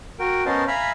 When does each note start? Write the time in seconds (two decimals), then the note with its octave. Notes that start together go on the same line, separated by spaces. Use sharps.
0.19 F#4 A#4 G5
0.46 B3 C#4 A#4 C5 D#5 A5
0.68 E5 F5 G#5 A#5 B5 F6